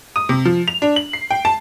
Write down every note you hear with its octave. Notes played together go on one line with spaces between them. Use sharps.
D#6
C3
F3
F7
D4
F#7
C7
G5
A5